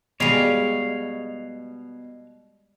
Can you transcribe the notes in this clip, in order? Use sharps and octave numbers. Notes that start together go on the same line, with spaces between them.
B2 G3 G#3 C#5 F5